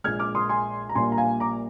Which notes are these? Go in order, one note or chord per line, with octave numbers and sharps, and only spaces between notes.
A#1 A#2 G#3 F6 G#6
D6 F6
C6 D#6
G#5 C6
A#5
A#1 A#2 G3 A#3 G#5 C6
A#5
F5 G#5
A#5 D6